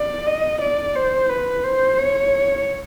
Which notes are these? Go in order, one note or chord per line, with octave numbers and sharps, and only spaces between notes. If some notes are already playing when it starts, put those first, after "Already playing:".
Already playing: D5
D#5
D5
C5
B4
C5
C#5